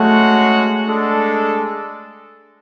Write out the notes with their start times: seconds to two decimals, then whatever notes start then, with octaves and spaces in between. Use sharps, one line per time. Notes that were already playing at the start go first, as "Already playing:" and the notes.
Already playing: G#3 A3 C#4 F#4 C#5 F#5
0.87 G#3 D4 A4